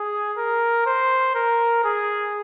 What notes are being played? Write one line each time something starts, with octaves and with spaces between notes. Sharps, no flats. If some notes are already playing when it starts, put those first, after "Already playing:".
Already playing: G#4
A#4
C5
A#4
G#4